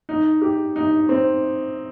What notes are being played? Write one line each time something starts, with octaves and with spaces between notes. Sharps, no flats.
D#4
G4
D#4
C4